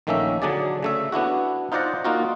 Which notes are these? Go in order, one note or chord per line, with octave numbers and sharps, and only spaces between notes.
A#1 D#3 A3 A#3 C#4 E5
D3 F#3 D4 G#4 D5
C#3 A3 E5
B3 D4 E4 F#4
D#4 F4 C5 D5 F#5 A#5
A#3 D#4 F4 F#4